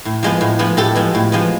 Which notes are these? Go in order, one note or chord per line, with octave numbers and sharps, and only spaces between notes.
A2
F3 G#3 B3
A2
F3 G#3 B3
A2 G4 A4
F3 G#3 B3
A2
F3 G#3 B3